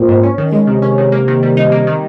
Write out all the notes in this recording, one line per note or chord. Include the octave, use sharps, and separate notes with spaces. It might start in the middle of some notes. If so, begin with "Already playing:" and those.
Already playing: A#2 C4
G#2
C#4
D#3
G#3
C3 D#3
C#4
D#3
A#3
D#3
G3
D#4
A#3
D#3